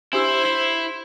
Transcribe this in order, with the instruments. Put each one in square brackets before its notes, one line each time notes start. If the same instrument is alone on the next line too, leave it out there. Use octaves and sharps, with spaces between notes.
[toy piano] D4 G4 E6 [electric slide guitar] E4 [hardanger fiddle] C5
[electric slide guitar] E4